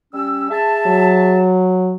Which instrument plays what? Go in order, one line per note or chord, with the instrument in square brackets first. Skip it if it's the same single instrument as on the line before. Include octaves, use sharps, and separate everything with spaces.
[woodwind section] G3 C#4 E6
G#4 E5 A5
[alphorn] F#3